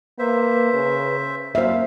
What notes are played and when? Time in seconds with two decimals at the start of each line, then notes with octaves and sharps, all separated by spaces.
0.19 A#3 B4 C5 E5
0.74 C#3
1.55 F#2 G3 A#3 C5 E5 F5